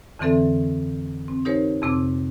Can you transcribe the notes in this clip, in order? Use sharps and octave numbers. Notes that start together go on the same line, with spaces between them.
F2 D3 E3 C4 A4 E5
C4
D#4 G4 A#4 C5 C#5
F2 C3 C4 D6